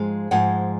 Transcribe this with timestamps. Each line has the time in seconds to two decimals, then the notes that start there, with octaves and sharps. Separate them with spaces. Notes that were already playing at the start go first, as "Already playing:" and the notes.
Already playing: G#2 F3 G#3 F5
0.31 G#2 F3 G#3 F#5